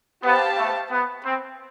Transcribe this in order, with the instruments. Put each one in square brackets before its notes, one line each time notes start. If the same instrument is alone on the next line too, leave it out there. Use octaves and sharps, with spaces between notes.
[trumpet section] B3 [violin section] G4 C5 F5 A5
[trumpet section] A3
B3
C4